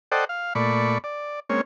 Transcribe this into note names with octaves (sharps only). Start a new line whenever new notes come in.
A4 C5 D5 D#5 F#5 G5
F5
A#2 A3 D5 B5 C#6
D5
G#3 A#3 C4 C#4 C#5